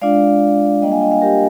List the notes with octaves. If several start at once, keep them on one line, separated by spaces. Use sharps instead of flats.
G#3 D4 F4 D5 F5
G3 A#3 D4 F4 D#5 G5
F5 G#5
D#5 G5
F5 G#5
G4 A#4